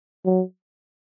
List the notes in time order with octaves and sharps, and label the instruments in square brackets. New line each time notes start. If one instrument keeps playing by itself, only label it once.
[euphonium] F#3